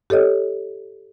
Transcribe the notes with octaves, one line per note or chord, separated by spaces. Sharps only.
G4 A4 C#5 D#5